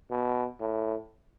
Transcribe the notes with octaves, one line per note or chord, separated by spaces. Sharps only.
B2
A2